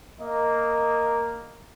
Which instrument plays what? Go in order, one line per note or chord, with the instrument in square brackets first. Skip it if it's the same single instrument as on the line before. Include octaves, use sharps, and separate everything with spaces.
[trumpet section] A#3 D#5